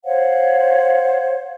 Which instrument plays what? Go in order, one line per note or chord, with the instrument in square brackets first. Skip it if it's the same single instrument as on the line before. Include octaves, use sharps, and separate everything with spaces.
[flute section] C5 C#5 F5 F#5